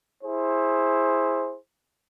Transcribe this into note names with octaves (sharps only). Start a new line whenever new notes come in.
E4 G#4 C5